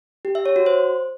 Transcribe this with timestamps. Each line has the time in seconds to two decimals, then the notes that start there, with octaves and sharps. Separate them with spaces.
0.25 G4
0.35 E5
0.46 C#5
0.56 F#4
0.66 C5